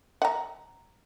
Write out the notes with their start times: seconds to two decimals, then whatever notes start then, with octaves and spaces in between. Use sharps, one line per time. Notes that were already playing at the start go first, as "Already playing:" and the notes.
0.22 F#5 A#5